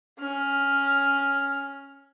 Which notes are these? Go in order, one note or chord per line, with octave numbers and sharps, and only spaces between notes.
C#4 F6